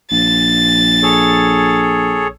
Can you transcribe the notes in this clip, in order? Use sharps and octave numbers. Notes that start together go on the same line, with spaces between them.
A#1 A6
G#4 A4 C#5